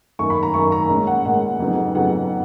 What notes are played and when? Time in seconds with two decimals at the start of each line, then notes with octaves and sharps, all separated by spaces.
0.19 F#2 D#3 A#3 C#6
0.30 B5
0.43 A#5
0.54 F#2 D#3 A#3 C#6
0.72 A#5
0.89 A#2 G#3 C#4
1.07 F#5
1.24 A#2 G#3 C#4 F#5
1.60 F2 C#3 F#3 B3 D#4
1.95 F2 C#3 F#3 B3 D#4 F#5